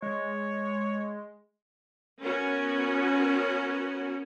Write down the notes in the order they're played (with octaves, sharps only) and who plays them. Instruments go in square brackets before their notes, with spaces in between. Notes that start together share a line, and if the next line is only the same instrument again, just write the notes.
[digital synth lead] G#3 [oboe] C#5
[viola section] B3 C#4 F#4 A#4